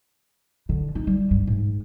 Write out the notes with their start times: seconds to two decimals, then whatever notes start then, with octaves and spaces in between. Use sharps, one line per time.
0.69 D3
0.95 D#4
1.07 G3
1.31 G2
1.47 G#2